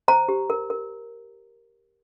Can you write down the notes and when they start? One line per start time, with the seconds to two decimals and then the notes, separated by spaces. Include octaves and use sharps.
0.08 C5 A#5
0.29 G4
0.50 A#4
0.70 A#4